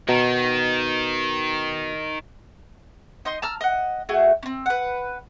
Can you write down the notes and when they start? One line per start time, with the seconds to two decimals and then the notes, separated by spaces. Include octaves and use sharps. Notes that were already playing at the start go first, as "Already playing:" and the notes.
0.09 B2 D#3
3.25 D#4 D#5 C6
3.42 A5 A#5 E6 F6
3.61 D#5 F#5
4.09 A3 F#4 G#4
4.43 C4 C#4
4.66 B4 F#5